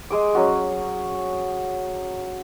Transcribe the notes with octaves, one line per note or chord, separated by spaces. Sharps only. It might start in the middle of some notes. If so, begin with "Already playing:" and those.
G#3 G#4 D6
F#3 C#4 F#4